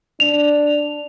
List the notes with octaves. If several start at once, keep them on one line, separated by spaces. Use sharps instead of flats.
D4 F7